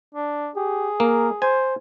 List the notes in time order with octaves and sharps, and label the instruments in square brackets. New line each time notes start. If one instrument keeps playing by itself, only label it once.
[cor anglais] D4
[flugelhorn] G4 [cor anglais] G#4
[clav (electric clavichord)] A#3 [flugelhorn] A#4
[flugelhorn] C5 [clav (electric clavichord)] G#5